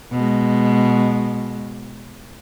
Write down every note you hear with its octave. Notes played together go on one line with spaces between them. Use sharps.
B2 G#3